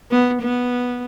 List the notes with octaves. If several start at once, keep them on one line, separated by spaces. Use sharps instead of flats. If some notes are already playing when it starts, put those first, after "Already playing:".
B3
B3